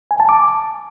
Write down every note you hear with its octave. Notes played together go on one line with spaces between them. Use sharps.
G#5
A5
D6